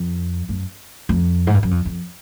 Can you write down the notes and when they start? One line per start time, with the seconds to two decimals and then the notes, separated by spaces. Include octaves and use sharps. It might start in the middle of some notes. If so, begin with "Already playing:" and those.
Already playing: F2
0.49 F#2
1.09 F2
1.47 G#2
1.54 G2
1.63 F#2
1.71 F2
1.85 F2